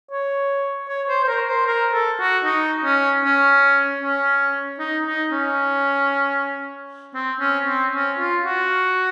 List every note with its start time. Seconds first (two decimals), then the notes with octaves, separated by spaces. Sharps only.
0.11 C#5
0.89 C#5
1.09 C5
1.24 C5
1.28 A#4
1.48 C5
1.67 A#4
1.93 A4
2.20 F#4
2.45 D#4
2.84 C#4
3.24 C#4
4.02 C#4
4.79 D#4
5.07 D#4
5.32 C#4
7.15 C4
7.40 C#4
7.66 C4
7.93 C#4
8.19 F4
8.45 F#4